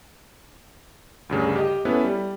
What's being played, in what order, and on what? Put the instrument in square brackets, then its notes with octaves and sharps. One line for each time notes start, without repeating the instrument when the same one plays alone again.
[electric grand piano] D2 G2 C#3
G4 D#5
B3 C#4 E4 A4 B4
G3